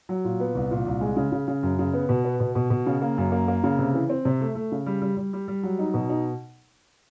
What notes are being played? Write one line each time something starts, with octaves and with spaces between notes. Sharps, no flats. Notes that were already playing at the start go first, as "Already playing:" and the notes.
F#3
A#2
B3
C2
A#2
C2
G#3
C#3
C#3
C#3
F#2
C#3
B3
B2
B3
B2
B2
B2
C#3
A#3
F#2
A#3
A#3
C#3
C3
E3
C4
C3
A3
A3
C#3
G3
G3
G3
G3
G3
F#3
D#4
B2
D#4